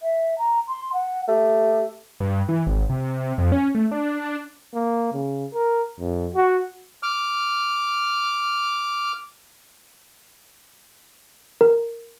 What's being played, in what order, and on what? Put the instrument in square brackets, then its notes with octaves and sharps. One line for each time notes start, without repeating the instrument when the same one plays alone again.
[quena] E5
A#5
C6
F#5
[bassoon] A3 [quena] G4
[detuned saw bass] G2
E3
G#1
C3
F2
C#4
A3
D4
[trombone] A#3
C#3
A#4
F2
F#4
[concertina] D6 F6
[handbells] A#4